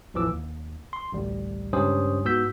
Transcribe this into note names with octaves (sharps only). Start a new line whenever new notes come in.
A1 E2 E3 F3 D6 E6
D#2
C6
A1 D2 G3
C#2 G2 C#4 G4 C5 D#6
G#2 B3 F#4 E6 G6 B6